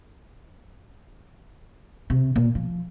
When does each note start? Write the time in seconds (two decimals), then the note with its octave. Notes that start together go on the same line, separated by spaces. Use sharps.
2.10 C3
2.36 A#2
2.55 F3